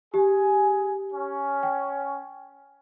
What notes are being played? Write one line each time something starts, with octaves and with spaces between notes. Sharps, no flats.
G4 G#4 G#5
C#4
G5